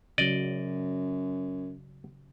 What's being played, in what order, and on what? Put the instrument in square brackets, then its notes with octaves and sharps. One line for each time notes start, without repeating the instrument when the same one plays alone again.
[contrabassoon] F#2 [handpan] C#3 F#3 [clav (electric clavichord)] D5 D#5